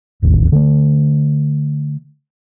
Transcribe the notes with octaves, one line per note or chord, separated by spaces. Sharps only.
E1 A1 D#2
D3 A3